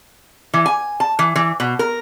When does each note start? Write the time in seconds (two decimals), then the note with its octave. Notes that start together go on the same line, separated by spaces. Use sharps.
0.54 E3
0.66 G#5
1.00 A5
1.19 E3
1.36 E3
1.60 B2
1.79 A#4